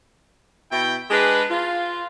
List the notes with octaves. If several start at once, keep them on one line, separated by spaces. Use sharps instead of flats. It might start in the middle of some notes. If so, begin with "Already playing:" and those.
B2 E4 G5
G#3 D4 G#4 B4
F4